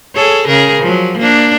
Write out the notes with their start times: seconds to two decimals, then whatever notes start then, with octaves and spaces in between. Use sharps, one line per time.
0.15 G#4 A4 C#5
0.47 C#3 G#4 A#4
0.81 F3 F#3
1.18 A#3 D4